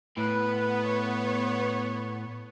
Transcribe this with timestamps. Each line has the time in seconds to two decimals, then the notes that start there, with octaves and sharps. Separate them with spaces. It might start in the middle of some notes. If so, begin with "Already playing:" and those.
0.17 A2 B3 B4
0.87 C#5